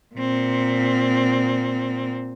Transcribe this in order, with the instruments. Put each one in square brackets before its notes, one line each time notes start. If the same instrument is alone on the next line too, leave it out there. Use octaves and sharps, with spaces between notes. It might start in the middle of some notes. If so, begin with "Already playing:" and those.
[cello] A#2 C4